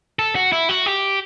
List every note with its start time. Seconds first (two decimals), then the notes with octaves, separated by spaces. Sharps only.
0.19 A4
0.35 F#4
0.52 E4
0.69 F#4
0.86 G4